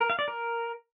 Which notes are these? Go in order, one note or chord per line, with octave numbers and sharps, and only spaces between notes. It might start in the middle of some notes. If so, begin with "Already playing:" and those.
A#4
F5
D5
A#4